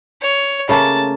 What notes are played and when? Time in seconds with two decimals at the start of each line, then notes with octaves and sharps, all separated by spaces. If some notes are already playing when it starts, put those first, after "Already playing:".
0.22 C#5
0.69 C#3 A3 A#3 A5